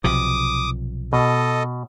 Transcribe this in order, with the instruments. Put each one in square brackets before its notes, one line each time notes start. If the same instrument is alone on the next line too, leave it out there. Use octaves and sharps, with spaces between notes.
[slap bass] B1 C3 F3 [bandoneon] D6 D#6
[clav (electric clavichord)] B2 [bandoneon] A4 D#5